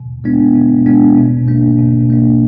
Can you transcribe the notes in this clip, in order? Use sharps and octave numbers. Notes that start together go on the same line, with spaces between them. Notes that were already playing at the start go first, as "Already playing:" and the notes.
Already playing: B2
G#3 B3 D4
B2
G#3 B3 D4
B2
A#3 D4
B2
A#3 D4